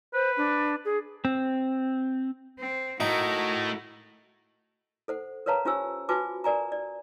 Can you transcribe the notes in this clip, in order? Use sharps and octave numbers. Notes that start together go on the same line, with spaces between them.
B4 C5
D4
G#4
C4
C4
A2 A3 D#4 F#4 A#4
A4 C5 F#5
A#4 B4 C#5 F5 A5 A#5
C#4 F4 G4 C5 G#5 E6
F4 F#4 B4 G#5 A5 D6
A#4 D5 G#5 A#5
D5